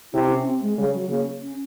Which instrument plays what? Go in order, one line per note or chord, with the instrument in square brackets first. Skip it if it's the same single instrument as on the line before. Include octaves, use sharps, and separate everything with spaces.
[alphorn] C3 [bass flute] E4
[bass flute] C#4
C4
G#3
[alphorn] C#3 [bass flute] G3
[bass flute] F#3
[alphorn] C#3 [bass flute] A#3
[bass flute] C#4